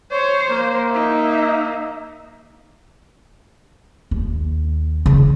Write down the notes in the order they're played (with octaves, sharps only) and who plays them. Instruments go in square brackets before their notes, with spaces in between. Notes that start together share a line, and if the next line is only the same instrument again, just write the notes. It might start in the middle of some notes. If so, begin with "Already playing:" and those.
[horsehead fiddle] C5 [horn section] C#5
[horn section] A#3
[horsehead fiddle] D#4 E5
[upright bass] D#2
C#3 C#4